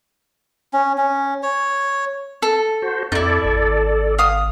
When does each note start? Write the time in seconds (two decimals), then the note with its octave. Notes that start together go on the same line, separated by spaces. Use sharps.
0.73 C#4
0.98 C#4
1.43 C#5
2.42 A4
2.82 F#4 C5
3.12 F2 D#4 E4 A4 D5
3.45 G#1
4.18 F5 D#6